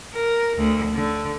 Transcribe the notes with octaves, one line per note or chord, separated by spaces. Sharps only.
A#4
D2
D3